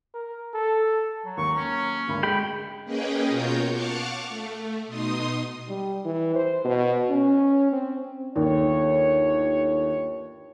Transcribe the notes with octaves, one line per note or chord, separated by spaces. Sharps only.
A#4
A4
F#3
D#2 C#6
A#3 C#4
G#1 D2 B5
G#3 G5 B5
A#3 C#4 G#4 B4 D#5 G5
B2 F4 F#4 A#4 C#5 G6
F5 F#5 A5 C#6 D6 F6
A3
B2 D#4 C6 D#6
G3
E3
C5
B2
C#4
C4
G1 D#2 C#5